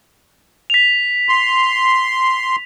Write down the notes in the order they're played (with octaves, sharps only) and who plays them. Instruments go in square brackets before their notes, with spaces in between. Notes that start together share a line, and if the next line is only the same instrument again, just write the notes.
[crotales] B6 F7
[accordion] C6